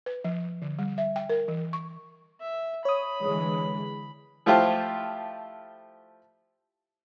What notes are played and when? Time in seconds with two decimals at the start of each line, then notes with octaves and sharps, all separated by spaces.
0.06 B4
0.24 F3
0.62 D3
0.79 G3
0.98 E5
1.16 G5
1.30 A#4
1.48 E3
1.73 C#6
2.41 E5
2.85 C#5 B5 D#6
3.22 D3 E3 G#3
4.46 F3 A3 E4 F4 G4 C5